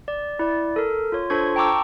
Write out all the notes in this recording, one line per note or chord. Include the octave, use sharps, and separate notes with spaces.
D5
E4 D5
A4 A#4
F4 C#5
D4 F4 A4 C5 C#6 G#6
G5 A5 A#5 C#6 D6 E6